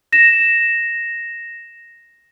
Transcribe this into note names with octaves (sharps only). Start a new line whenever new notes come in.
A#6 E7